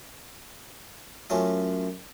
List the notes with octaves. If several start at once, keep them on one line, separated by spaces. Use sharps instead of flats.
F#2 A3 C#4 F4 D#6